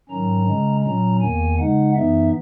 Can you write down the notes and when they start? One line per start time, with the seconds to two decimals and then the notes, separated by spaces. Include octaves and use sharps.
0.09 G#2 D#3 F#3 C#4 A#5
0.47 C#3 G#3 C#4
0.83 A#2 F#3 C#4 A#5
1.21 E2 D#3 A#3 G#5
1.58 C#3 G#3 D#4 F#5
1.95 F#2 E3 B3 D#4 E5